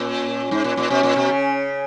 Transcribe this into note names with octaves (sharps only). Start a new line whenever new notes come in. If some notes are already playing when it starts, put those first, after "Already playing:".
Already playing: A#2 C#4
G#2
A#2
A#2
B2 C#4
A#2
B2
C#3